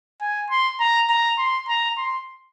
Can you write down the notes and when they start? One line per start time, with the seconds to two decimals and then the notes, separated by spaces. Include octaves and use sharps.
0.21 G#5
0.50 C6
0.80 A#5
1.09 A#5
1.38 C6
1.69 A#5
1.97 C6